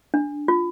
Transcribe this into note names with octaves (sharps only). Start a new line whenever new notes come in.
D4
F4